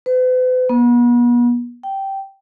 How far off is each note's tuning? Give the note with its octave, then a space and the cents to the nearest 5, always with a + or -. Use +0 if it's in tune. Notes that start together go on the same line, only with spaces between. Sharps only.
B4 +45
B3 -40
G5 -10